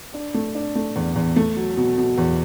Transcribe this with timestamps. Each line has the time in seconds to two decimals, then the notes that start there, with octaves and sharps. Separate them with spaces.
0.14 D4
0.34 A3
0.55 D4
0.75 A3
0.96 E2
1.16 E2
1.36 A3
1.57 F#3
1.77 B2
1.98 B2
2.18 E2